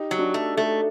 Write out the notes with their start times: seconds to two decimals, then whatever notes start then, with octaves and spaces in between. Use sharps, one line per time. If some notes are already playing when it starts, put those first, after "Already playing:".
Already playing: D#4 G4
0.11 F#3
0.18 D4 F#4
0.34 A3
0.57 A3